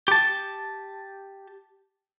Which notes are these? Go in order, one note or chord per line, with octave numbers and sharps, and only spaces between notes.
G4 A5